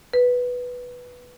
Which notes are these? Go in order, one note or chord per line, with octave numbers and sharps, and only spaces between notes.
B4